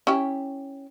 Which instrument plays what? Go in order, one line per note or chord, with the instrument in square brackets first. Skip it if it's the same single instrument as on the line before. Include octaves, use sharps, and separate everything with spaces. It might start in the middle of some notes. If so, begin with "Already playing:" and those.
[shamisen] C#4 E4 G4